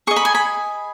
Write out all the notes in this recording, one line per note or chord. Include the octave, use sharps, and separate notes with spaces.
G#4 D#5 C#6
B5
G#5
B5